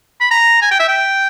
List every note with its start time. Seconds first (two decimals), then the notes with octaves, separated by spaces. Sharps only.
0.21 B5
0.31 A#5
0.62 G#5
0.71 G5
0.80 E5
0.89 G5